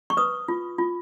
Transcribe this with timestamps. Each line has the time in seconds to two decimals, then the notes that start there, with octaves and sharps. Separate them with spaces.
0.10 C#6
0.17 B4 D#6
0.48 F4
0.78 F4